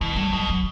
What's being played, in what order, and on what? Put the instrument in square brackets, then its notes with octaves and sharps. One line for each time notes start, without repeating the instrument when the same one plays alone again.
[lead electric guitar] B2 [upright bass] E3
[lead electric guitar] A2 [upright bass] G3
[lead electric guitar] B2 [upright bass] F#3
[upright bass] F#3